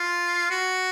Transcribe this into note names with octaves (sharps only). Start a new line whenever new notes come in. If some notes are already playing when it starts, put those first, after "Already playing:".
Already playing: F4
F#4